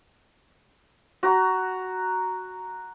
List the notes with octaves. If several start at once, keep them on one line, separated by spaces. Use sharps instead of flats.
F#4 A#5